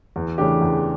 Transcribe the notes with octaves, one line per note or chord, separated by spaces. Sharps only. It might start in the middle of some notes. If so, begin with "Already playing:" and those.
E2
C#3 E3 A3 D4 G4
E2